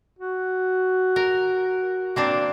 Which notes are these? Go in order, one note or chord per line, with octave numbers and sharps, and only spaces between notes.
F#4
A#4
A#3 C4 D4